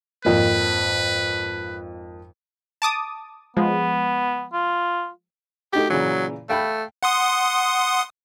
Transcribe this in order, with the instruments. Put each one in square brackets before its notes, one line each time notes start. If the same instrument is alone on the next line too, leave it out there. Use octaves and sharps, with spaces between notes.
[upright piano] G#1 F2 A#3 [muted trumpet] B4
[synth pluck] A5 D6 D#6
[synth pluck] F3 G#3 [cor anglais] B3
[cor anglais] F4
[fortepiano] A3 D#4 F#4 [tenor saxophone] G4
[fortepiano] A#2 C#3 E3 [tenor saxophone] F#3
[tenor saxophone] A3 [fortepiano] F5 G5 B5
[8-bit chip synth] F#5 C6 D#6